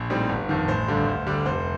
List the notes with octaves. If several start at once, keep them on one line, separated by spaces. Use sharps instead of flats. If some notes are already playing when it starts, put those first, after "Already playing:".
Already playing: A#1
A2 G3 C4 D#4
G1
F2 D#3
A1 C5
G2 D3 G3
D2
D3 G3 D4
F1 C5